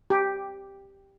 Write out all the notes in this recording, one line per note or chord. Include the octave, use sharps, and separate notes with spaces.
G4